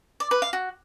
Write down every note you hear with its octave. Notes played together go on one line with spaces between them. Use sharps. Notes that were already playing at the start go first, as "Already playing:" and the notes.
D5
B4
F5
F#4